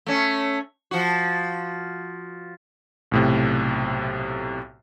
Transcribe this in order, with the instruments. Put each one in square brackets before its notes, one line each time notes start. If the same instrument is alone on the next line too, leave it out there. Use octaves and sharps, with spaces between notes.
[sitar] A3 C#4
F3 F#4
[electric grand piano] B1 A2 C3